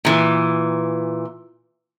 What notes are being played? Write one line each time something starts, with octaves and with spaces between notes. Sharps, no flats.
A#2 E3